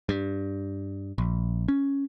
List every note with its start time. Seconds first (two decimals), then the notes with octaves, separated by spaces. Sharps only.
0.09 G2
1.18 A#1
1.68 C#4